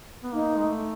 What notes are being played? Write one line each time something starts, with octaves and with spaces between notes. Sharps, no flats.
B3
A#3 D#4
G#3
A3